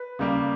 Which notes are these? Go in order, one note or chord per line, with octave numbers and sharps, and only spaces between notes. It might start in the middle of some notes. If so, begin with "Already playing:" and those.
Already playing: B4
C#3 G3 A#3